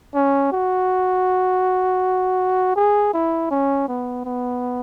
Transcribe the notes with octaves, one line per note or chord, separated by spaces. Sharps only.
C#4
F#4
G#4
E4
C#4
B3
B3